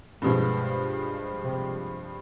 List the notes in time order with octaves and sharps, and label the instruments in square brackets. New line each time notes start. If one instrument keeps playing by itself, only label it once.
[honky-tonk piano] G2 F3 G#3 [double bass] B2
[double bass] C3